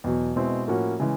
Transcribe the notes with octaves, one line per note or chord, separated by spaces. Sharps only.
E2 B2 F#3
B2 G#3 C4 E4
A2 F3 A#3 C#4 F#4
C#3 E3 G#3